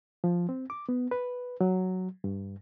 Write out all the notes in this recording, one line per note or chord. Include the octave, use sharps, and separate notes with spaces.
F3
C4
D6
B3
B4
F#3
G2